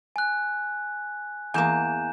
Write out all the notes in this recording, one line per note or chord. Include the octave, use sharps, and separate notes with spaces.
G#5 F#6
E2 A#3 G#5 G6 E7